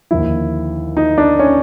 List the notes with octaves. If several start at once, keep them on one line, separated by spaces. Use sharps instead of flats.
D#2 D3 F3 E4
D#4
D4
C#4